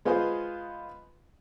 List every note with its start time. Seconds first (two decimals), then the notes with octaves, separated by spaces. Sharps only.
0.05 G#3 B3 F4 G#4 C5